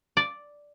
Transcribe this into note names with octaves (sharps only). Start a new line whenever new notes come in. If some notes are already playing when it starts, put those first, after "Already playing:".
D5